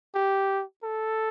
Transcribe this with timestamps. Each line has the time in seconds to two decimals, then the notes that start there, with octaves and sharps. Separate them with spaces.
0.15 G4
0.84 A4